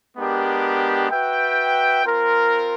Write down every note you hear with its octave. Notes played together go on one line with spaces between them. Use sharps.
G#3 B3 D4 G4 A#4
F#4 B4 E5 G5
C4 F4 A#4